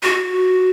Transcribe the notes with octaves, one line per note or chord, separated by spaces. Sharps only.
F#4